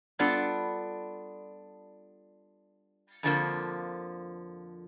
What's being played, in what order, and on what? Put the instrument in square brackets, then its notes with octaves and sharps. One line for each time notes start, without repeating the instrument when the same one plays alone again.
[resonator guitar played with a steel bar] G3 B3 D4 F4 A4
F2 D3 F3 A#3